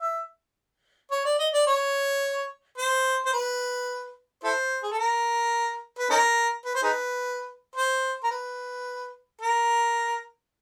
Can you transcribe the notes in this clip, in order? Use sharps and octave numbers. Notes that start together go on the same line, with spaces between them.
E5
C#5
D5
D#5
D5
C#5
C5
C5
B4
E4 A4 C5
G#4
A4
A#4
B4
C#4 D#4 A#4
B4
C5
D#4 G#4 B4
C5
A#4
B4
A#4